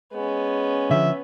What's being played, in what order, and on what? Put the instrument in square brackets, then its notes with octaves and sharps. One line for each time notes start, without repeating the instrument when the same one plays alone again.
[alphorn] G#3 [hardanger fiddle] B3 C#4
[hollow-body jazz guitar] D3 F3 [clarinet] E5